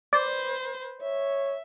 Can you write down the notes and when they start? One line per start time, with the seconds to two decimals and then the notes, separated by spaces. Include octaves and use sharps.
0.13 B4 C5 D5
1.01 C#5 E5